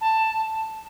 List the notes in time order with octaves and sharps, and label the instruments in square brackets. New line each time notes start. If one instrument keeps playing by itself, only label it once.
[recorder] A5